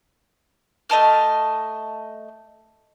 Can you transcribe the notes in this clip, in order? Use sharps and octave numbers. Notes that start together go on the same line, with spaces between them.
A3 D#5 A5 F6